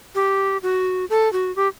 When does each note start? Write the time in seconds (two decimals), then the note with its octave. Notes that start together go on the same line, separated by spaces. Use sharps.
0.15 G4
0.63 F#4
1.10 A4
1.33 F#4
1.56 G4